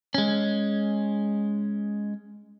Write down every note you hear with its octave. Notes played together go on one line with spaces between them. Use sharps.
G#3 C#4